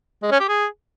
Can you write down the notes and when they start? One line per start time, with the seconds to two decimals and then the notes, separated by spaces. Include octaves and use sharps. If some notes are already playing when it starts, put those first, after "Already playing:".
0.23 G#3
0.31 C#4
0.40 G4
0.49 G#4